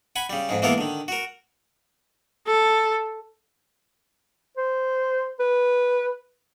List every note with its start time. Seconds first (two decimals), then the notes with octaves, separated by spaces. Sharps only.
0.16 F#5 G#5 B5
0.30 C#3 G3
0.49 F2 G#2 G#3
0.62 E3 G#3 A#3 B3 A4 A#4
0.78 D3 D#3
1.08 F#4 A#4
2.47 A4
4.57 C5
5.39 B4